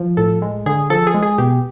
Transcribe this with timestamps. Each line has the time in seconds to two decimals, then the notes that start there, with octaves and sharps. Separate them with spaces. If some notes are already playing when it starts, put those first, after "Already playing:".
Already playing: F3
0.17 A2 A4
0.42 G#3
0.66 D3 G#4
0.90 F3 A4
1.07 G#4
1.14 G#3
1.22 G#4
1.38 B2 G4